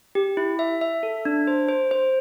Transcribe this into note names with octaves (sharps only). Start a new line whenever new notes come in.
G4
E4
E5
E5
A4
D4
C5
C5
C5